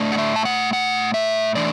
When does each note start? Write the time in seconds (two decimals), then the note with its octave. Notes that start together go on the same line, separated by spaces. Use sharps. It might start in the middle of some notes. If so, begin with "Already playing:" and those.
Already playing: A2 A3 D4
0.12 F#5
0.18 E5
0.36 A5
0.45 F#5
0.73 F#5
1.14 E5
1.55 E3 A3 D4 D5